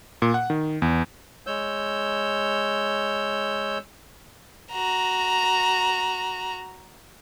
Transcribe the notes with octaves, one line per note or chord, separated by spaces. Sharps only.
A#2
F#5
D#3
E2
G#3 C#5 E6 G6
F#4 A#5